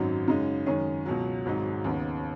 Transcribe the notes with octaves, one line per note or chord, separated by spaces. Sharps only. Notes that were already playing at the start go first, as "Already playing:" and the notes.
Already playing: G#1 F#2 F#3 D#4
F#2 C#3 G#3 D#4
F#2 D#3 G#3 C#4 G#4
C#2 B2 F#3
G#1 G#2 F#3 D#4
D#2 C#3 B3 D#4